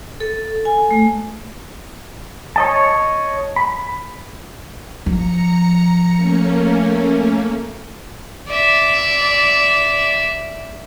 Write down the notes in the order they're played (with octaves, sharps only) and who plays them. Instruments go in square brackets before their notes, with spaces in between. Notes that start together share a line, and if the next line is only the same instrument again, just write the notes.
[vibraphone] A4
G#5
A3
[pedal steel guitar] C#5 D#5 A5
B5
[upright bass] F3 [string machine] A#5 C#7
[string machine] A3 A#3 C#4
[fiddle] D5 E5